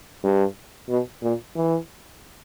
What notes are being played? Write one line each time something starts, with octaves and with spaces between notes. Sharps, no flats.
G2
B2
A#2
E3